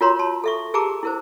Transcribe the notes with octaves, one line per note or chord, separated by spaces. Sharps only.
F4 F#4 A#4 C#5 A#5 C6
A5 C6
A4 E5 C#6
G4 G#4 A#4 A5 A#5 D6
E4 A#4 C5